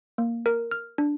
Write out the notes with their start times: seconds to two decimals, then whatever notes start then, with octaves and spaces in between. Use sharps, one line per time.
0.18 A#3
0.46 A#4
0.71 F6
0.98 D4